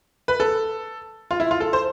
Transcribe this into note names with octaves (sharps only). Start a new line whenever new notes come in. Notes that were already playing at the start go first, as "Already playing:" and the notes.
B4
A4
F4
E4
F4
A4
C5